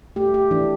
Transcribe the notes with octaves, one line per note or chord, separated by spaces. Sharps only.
A3 G4
G4
E3 D4